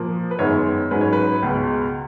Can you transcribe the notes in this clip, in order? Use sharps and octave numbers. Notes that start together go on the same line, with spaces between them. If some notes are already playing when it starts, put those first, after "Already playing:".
Already playing: A#2 F3 A#3
B4
F#2 D#3 G#3 B3 C#5
G#2 F#3 C#4 B4
C#5
B4
C#2 B2 G#3